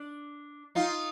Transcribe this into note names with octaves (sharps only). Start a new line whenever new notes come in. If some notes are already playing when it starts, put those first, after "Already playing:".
Already playing: D4
D#4 F4